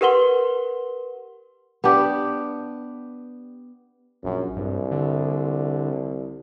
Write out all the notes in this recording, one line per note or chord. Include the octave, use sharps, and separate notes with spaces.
G4 A#4 B4 F#5 C6 G7
B3 D4 G4
A#1 F#2
C2 G2
D3